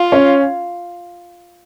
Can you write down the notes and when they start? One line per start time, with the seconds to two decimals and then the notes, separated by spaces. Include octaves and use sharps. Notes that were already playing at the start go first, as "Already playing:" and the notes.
Already playing: F4
0.12 C#4